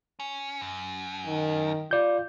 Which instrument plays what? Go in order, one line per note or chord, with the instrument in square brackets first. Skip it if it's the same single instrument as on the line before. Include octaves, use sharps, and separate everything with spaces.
[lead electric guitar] C#4
F#2
[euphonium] D#3
[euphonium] F4 [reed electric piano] D5 G6